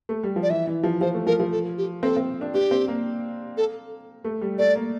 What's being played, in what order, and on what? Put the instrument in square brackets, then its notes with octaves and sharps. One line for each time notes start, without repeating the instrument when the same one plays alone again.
[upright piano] A3
G3
F3
[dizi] D5
[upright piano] E3 [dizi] E5
[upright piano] E3
F3
[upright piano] F3 [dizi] C5
[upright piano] A3
[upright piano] F3 [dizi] A#4
[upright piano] F3
[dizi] A4
G4
[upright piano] C4 [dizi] A4
[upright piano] C4
D4
[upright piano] D4 [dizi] G4
[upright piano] C4
A#3
[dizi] A4
[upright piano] A3
G3
[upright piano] A3 [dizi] D5
[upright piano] A#3